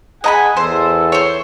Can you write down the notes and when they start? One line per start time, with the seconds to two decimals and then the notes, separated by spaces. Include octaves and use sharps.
0.24 G#4 D#5 F#5 G#5 A#5 B5
0.57 E2 A4 C5
1.12 C5 C#5